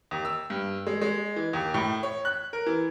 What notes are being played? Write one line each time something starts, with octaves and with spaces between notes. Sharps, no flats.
D#2
E6
G2
G#3
G#3
E3
D#2
A2
C#5
F#6
A#4
E3